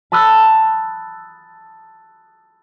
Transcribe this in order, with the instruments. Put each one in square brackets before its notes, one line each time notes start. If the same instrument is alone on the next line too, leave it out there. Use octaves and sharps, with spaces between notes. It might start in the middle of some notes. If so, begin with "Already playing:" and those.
[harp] A5 B5 D#6 E6 F#6 A6